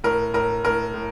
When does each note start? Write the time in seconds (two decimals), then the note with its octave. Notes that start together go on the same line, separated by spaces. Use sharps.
0.04 A2 A#4
0.34 A2 A#4
0.64 A2 A#4
0.94 A2